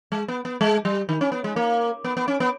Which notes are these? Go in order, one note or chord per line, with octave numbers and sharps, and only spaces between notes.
G#3
B3
B3
G#3
G3
D#3
C#4
B3
G#3
A#3
B3
B3
C#4
B3